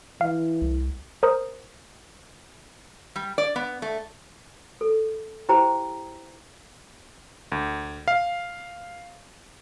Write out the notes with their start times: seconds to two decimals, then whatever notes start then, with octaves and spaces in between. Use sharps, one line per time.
0.21 E3 F5
0.62 C2
1.23 A#4 C5 A#5 D#6
3.16 G3
3.38 D5
3.56 B3
3.82 A3
4.81 A4
5.49 E4 G4 C5 G5 A#5
7.52 D2
8.08 F5